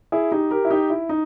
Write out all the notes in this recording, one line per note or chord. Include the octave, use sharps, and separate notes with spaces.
E4 G#4
D#4 G4
G4 A#4
E4
D#4 G4
E4
D#4